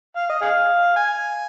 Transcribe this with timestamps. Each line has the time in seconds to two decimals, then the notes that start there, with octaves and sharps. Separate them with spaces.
0.16 F5
0.29 D#5
0.41 G#4 F5
0.96 G#5